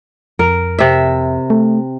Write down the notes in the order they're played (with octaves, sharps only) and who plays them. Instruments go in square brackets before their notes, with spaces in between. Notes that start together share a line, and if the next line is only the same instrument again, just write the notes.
[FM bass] F2 [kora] A#4
[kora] C3 E5
[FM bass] A3